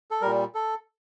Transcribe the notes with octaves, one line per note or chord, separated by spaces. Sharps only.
A4
A#2 G3 A#4
A4